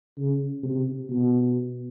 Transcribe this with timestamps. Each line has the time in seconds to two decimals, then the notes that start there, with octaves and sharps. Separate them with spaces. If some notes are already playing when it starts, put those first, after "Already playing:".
0.17 C#3
0.63 C3
1.09 B2